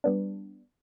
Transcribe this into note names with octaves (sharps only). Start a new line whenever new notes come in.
G3 B3 D4